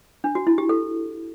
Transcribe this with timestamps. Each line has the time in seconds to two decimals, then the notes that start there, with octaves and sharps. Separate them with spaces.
0.24 D4
0.35 F#4
0.47 E4
0.58 G4
0.69 A4